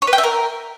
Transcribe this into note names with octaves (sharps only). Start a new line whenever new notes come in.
C#5
B4
G5
E5
A#4